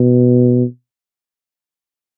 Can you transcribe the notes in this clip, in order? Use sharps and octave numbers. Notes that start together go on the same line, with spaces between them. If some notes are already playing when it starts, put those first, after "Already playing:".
Already playing: B2